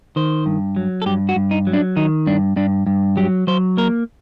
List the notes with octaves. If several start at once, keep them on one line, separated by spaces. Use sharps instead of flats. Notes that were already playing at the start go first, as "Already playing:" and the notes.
D#3 C5
G2
F#3
A4
G2 G4
F#4
G2
D#4
F#3
D4
D#3 D#4
G2 D4
G2 D4
G2
F#3 G4
F#3 C5
A#3 A#4